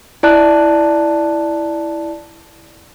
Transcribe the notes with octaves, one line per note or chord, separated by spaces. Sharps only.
E4 D5 A5 F#6